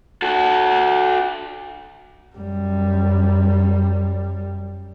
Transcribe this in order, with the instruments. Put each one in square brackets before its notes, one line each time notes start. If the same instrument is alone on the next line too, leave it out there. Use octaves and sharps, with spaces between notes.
[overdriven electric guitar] F#4 A4
[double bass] F#2 G3